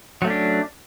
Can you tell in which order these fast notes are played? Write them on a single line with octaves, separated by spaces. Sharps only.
F#3 A3 C#4 D4